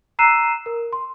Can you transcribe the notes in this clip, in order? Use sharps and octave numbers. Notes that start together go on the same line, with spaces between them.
A#5 E6 F#6 C7 D#7 E7
A#4
C6